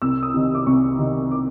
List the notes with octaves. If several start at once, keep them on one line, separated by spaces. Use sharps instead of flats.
C2 E6
D#6
C3 D#3
D6
C2 C#6
C3 D#3
D6